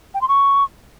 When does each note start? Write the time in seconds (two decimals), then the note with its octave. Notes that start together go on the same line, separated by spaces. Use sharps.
0.14 G5
0.21 C6
0.28 C#6